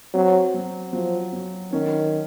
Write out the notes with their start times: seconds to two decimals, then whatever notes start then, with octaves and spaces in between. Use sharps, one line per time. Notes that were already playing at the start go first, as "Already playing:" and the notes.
0.14 F#3 C4
0.54 F#3
0.93 F3 F#3
1.33 F#3
1.72 D#3 C#4